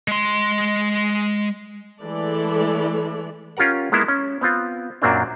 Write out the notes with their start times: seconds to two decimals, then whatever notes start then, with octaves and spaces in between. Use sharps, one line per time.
0.08 G#3 C6
2.02 E3 G#3 A3 A4 D5
3.57 C#4 F4 G4 A#4 F#5
3.92 G#3 A#3 B3 E4
4.08 C#4
4.41 B3 C4 F4
5.02 F#2 A#2 F#3 A#3 C4 D4